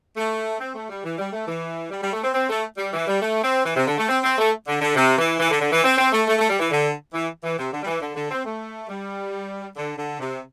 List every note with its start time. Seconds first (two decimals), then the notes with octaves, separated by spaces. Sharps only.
0.16 A3
0.60 C4
0.75 A3
0.89 G3
1.04 E3
1.18 G3
1.32 A3
1.47 E3
1.91 G3
2.02 G3
2.12 A3
2.23 C4
2.34 C4
2.49 A3
2.77 G3
2.93 E3
3.07 G3
3.22 A3
3.44 C4
3.65 E3
3.76 C3
3.86 D3
3.98 A3
4.09 C4
4.23 C4
4.38 A3
4.67 D3
4.81 D3
4.96 C3
5.18 E3
5.40 E3
5.50 D3
5.61 D3
5.72 E3
5.84 C4
5.98 C4
6.12 A3
6.27 A3
6.38 A3
6.49 G3
6.59 E3
6.71 D3
7.14 E3
7.43 E3
7.58 C3
7.72 D3
7.82 G3
7.86 E3
8.02 D3
8.15 D3
8.31 C4
8.45 A3
8.89 G3
9.76 D3
9.98 D3
10.20 C3